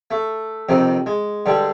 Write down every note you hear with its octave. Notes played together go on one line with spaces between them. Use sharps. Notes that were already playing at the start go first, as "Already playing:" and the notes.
A3
F2 C3 D#3
G#3
G2 D3 G3